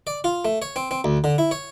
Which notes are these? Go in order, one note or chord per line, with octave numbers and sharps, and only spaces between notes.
D5
F4
A3
C#5
C4
C4
D2
D3
E4
C#5